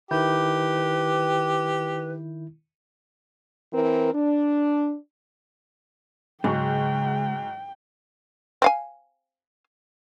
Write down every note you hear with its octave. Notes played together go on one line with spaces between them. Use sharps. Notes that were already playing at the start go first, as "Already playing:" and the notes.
D#3 E4 G4 B4 G6
E3 C4 A#4
D4
G#2 C#3 F#3 G#3 G5 C#6
C4 F5 G#5